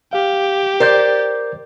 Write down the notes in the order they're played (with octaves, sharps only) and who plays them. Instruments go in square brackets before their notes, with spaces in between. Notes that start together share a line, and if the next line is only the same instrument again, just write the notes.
[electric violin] G4 [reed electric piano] F5
[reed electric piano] A#4 G6 [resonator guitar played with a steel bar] C5 D5